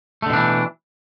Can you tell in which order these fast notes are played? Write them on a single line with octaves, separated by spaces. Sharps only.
A3 D3 B2 D4 E3